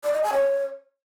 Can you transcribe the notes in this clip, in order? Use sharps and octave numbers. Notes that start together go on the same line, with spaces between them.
D5
D#5
G#5
C#5